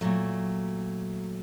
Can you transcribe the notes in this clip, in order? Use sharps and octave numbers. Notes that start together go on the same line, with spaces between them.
A#2 F#3 A3